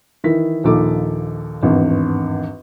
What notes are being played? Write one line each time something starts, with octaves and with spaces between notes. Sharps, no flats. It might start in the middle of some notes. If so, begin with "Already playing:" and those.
D#3 E3 E4 B6
A#1 D#2 F3 D#4 A4 D6
G#1 E2 G2